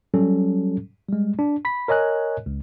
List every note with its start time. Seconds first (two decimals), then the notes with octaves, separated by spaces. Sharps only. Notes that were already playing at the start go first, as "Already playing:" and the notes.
0.14 F#3 G3 C#4 A4
1.09 G3 G#3
1.39 D4
1.65 B5 B6
1.88 A#4 C#5 D#5 G#5 F#6
2.46 C#2